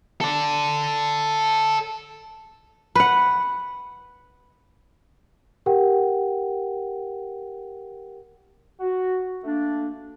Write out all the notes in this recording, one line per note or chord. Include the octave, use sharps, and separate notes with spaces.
A4 D5
B4 F#5
G4 A#4 F#5 G5
F#4
A3 A#3 D4